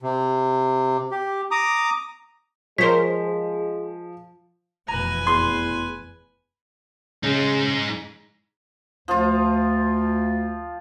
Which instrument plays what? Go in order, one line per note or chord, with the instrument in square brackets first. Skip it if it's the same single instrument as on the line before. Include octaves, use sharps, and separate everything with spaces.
[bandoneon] C3
G4
A#5 D6 D#6
[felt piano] F3 [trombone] G#3 [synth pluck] A#4 C5 C#5 [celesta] B6
[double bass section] F1 B2 E3 [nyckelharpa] B4 G#5 [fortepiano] A#5
[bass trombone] E2 [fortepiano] C6
[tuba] C#3 [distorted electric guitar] G#3 D#4
[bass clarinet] D2 [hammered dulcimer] F3 F4